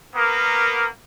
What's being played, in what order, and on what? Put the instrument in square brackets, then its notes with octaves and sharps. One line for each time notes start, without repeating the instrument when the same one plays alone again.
[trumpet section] A#3 B3 A#4